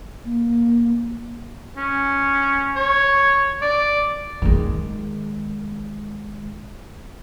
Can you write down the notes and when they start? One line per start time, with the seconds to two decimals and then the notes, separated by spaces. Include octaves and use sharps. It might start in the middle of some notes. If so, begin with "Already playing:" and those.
0.25 A#3
1.76 C#4
2.76 C#5
3.62 D5
4.42 D#3 G#3